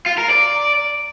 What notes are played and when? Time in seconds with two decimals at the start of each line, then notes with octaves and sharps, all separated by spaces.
0.06 F4
0.18 A#4
0.30 D5